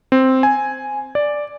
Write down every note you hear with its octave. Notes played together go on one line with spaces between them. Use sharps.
C4
G#5
D5